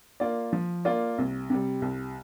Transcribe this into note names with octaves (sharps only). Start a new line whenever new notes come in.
A#3 F4 D5
F3
A#3 F4 D5
C2
C3 G3
C2